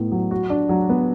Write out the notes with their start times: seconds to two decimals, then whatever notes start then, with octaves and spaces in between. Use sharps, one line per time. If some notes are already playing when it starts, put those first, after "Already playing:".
Already playing: A2 B3 D#4
0.12 F#3
0.31 F#4
0.50 D4
0.69 F#3
0.89 B3